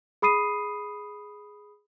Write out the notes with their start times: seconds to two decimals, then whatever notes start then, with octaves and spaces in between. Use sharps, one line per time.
0.22 G#4 B5 D#6 C7 D#7